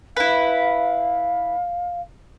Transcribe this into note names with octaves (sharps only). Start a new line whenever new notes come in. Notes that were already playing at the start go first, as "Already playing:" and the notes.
E4 B4 F5